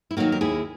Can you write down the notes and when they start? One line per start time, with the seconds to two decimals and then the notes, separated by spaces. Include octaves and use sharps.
0.11 E4
0.17 D#3 F#3 A#3 D#4 F#4
0.32 A#4
0.41 D#2 E4 G#4